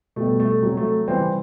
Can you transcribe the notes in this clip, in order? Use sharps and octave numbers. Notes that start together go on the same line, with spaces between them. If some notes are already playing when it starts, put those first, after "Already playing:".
B2 G3 A3
A3
C3 F#3
A3
C3 E3 G3 C4